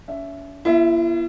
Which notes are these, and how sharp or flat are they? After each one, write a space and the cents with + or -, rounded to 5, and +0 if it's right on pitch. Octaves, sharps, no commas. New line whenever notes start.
C#4 +40 E5 +10
B3 -45 E4 +45 E5 +0